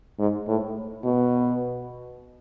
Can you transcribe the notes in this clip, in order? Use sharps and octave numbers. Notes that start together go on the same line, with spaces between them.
G#2
A2
B2